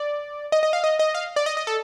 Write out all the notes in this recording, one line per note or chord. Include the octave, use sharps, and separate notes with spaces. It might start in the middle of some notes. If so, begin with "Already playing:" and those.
Already playing: D5
D#5
D#5
F5
D#5
D#5
F5
D5
D#5
D#5
A4